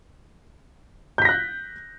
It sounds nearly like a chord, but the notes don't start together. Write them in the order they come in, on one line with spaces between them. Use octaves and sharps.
G6 B6 A#6 F#6